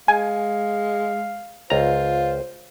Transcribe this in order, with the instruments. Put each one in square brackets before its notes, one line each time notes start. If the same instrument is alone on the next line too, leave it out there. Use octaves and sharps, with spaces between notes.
[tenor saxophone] G#3 [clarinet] F5 [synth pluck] G#5
[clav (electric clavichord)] C#2 A#5 [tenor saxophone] F4 [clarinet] C5